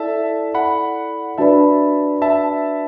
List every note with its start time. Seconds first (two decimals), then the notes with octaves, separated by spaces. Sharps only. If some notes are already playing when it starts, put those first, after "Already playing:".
Already playing: E4 A4 D5 E5 A5
0.55 F#5 B5
1.38 D4 F#4 B4 D5 E5 A5 B5
2.22 E5 A5